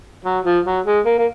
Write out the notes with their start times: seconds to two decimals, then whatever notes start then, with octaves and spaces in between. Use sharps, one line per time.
0.24 F#3
0.45 F3
0.66 F#3
0.86 G#3
1.06 A#3
1.18 A#3